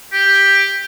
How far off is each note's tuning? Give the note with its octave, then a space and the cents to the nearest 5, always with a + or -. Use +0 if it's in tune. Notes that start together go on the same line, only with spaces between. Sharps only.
G4 +5